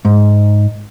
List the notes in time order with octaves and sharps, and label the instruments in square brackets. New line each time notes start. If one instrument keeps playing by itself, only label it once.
[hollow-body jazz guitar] G#2